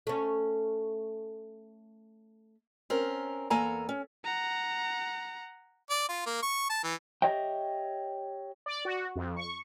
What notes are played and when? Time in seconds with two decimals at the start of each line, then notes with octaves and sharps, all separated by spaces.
0.07 A3 C#4
2.90 C4 C#4 A#4
3.50 E2 A#3 A4 G#5 A#5
3.89 C#4
4.24 F#5 A#5
5.90 D5
6.09 F4
6.26 A#3
6.43 C#6
6.70 A5
6.84 E3
7.22 G4 C#5 D#5 E5 G5
8.66 D5
8.85 F#4
9.16 F2
9.37 C#6